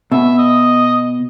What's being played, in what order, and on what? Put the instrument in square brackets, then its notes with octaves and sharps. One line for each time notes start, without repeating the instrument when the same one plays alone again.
[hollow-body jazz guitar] B2 [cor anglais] E5
[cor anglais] D#5